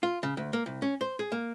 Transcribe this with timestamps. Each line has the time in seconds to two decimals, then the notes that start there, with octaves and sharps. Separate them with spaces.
0.03 F4
0.23 C#3
0.37 D2
0.53 A#3
0.66 C2
0.82 C#4
1.01 C5
1.19 G#4
1.32 A#3